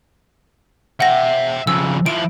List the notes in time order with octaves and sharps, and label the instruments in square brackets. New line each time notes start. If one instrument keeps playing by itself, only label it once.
[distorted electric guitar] E5 G5 [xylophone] F#5 A#6
[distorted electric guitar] F2 C#3 [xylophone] E6
[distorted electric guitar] F3 E4 [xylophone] D7